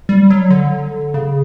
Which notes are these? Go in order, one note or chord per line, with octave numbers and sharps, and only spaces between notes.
G3
F#3
D3
C#3